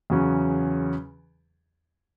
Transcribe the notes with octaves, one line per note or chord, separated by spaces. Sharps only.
E2 C#3 F#3 C#4